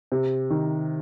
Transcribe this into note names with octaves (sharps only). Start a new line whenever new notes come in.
C3
D#3